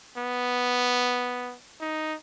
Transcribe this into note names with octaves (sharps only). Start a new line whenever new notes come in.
B3
D#4